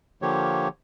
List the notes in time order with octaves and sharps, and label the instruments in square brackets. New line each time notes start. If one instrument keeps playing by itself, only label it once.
[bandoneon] D3 F3 A#3 G4 C#5